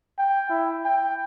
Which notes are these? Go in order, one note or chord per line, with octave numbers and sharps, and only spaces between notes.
G5
E4
G5